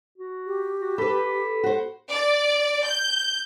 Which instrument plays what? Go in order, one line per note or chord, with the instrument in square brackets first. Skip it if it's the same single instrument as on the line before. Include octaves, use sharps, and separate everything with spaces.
[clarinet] F#4
[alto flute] G4
[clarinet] F#4
[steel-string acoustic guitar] A4 B4 [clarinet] B5
[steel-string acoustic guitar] F#4 C5
[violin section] D5
G6